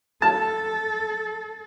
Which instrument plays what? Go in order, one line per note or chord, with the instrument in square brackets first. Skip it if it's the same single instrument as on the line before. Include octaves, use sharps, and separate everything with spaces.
[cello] A4 [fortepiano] A5